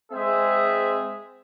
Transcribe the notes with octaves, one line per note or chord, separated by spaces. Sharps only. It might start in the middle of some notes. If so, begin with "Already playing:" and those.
G#3 C4 G#4 C5 E5